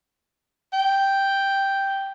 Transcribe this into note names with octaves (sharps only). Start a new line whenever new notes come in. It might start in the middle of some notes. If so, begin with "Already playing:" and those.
G5